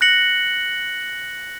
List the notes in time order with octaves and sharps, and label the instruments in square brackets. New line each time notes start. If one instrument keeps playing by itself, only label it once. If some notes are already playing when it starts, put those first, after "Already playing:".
[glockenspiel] F#6 A#6 C#7 F#7